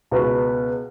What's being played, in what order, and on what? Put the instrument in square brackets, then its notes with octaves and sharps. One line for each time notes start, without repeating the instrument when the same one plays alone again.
[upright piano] C#2 B2 B3 F#4 B4